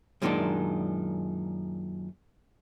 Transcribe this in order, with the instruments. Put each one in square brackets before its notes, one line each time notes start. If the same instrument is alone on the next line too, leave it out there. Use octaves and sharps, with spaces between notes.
[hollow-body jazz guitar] F#2 A#2 D#3 G#3 C4 D4